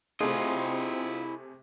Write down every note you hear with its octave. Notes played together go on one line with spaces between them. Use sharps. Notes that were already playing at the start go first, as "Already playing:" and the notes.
C3 A3 C4 C#4 E4 F4 G#4 D#5